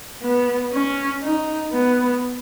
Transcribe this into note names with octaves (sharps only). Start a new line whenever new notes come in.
B3
C#4
D#4
B3